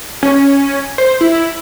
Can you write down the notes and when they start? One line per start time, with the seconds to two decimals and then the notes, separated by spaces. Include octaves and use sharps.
0.23 C#4
0.98 C5
1.21 E4